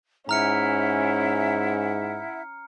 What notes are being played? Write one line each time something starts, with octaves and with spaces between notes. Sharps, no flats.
G#2 C#4 E4 E5 F#5 A#5 F6 C#7